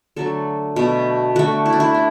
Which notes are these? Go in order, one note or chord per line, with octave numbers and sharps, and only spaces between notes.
D3 F#3 A3 A4
B2 A3
D3 A3 F#4
E4
D4
E4
D4